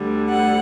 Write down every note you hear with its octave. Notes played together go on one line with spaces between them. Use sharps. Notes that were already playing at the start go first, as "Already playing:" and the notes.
Already playing: D2 D3 G3
F#5